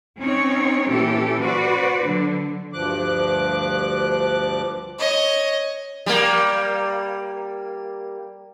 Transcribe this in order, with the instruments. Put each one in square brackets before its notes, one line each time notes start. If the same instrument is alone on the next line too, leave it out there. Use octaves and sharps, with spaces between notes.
[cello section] C4 C#4 D#4 C#5
A#2 E3 C#4 G4 A4
F#4 B4 C5 D5
D3 F#3
[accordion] D2 G2 F3 D6 F#6
[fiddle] C#5 D#5
[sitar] G3 A#3